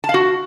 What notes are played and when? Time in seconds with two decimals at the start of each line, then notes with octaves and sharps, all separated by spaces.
0.04 A5
0.09 F5
0.14 F#4